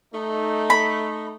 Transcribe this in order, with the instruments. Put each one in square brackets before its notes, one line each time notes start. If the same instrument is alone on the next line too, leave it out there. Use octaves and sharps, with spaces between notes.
[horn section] A3 D#4
[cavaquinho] B5